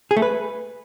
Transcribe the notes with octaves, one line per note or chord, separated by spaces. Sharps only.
G#4
A3
B4